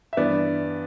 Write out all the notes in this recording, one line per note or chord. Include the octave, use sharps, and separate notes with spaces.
E5
G2 E3 B3 D5